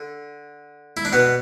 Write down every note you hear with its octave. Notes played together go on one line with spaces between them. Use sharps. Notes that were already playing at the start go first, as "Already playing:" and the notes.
Already playing: D3
E4
D4
B2 B3